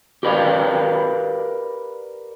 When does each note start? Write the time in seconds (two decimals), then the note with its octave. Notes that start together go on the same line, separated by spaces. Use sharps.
0.23 G4 A#4 B4 D5 F5